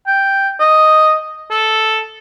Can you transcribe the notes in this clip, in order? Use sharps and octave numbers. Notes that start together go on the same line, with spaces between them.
G5
D#5
A4